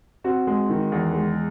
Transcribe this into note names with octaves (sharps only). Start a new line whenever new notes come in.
C4 F#4
G#3
D#3
E2
G#3